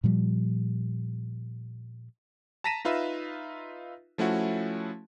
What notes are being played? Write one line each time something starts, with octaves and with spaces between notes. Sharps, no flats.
A#2 F3 G3
A5 A#5 A#6 B6 D#7 E7
D#4 F4 B4 E5
F3 A3 C#4 E4 F#4